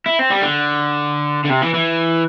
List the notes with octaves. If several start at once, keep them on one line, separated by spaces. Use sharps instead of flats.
E4
C4
G3
D3
D3
C3
E3
E3